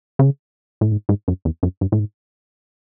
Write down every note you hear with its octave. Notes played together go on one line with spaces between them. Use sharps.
C#3
A2
G#2
G#2
F#2
E2
F#2
G2
A2
G#2